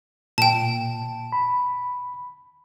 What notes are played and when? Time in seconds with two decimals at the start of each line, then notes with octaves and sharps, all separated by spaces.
0.38 A#2 G5 A5
1.32 B5